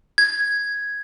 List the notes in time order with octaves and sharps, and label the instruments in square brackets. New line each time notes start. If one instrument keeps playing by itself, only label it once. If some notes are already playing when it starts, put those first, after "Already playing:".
[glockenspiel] G#6